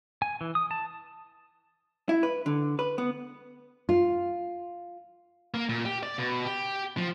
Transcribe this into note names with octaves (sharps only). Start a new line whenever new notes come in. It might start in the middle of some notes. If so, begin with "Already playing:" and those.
G#5
E3
D#6
A5
E4
B4
D3
B4
B3
F4
A#3
A#2
G4
D5
B2
G4
F3